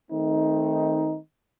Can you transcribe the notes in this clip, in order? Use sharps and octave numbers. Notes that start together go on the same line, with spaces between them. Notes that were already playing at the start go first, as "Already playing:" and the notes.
D#3 A3 C4 D#4